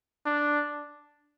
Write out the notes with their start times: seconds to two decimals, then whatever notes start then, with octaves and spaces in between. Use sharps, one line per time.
0.26 D4